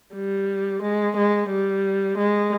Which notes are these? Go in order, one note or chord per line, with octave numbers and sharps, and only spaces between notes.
G3
G#3
G#3
G3
G#3